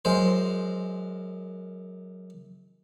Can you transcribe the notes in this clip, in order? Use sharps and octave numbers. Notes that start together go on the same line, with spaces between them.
F#2 G#3 C5